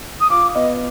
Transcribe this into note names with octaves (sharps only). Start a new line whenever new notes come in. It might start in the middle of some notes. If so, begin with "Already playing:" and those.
D#6
F4 D6
B3 D#5